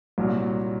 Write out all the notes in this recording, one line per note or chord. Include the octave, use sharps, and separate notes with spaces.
C2 A#2 F#3